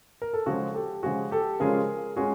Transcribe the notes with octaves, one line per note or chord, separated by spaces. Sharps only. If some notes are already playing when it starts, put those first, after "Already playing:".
A#4
A4
C#3 F3 G#3 F#4 G#4
G4 A4
C#3 F3 G#3 F#4 G#4
G4 A4
C#3 F3 G#3 C#4 F4 G#4 A#4
G#3 C#4 F4 F#4 G#4